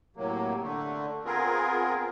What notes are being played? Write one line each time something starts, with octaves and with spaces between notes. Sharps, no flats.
A2 C3 F#3 A#3
D3 A3
B3 C4 F4 G#4 A#4